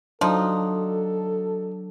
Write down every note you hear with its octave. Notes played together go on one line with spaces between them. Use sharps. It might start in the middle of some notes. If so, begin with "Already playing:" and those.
F3 F#3 D4 D#4 A4